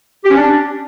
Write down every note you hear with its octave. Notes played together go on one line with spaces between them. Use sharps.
G4
C#4
D4